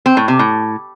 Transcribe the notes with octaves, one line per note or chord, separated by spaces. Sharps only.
C4
A2
C3
A2